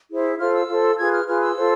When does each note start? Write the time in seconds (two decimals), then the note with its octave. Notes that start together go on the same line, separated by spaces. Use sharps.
0.10 E4 G#4 C5
0.39 F4 A4 C5 F6
0.54 E6
0.68 F4 A4 C5
0.97 F4 G#4 B4 G#6
1.13 F6
1.27 F4 G#4 B4 F6
1.42 E6
1.56 F4 A4 C5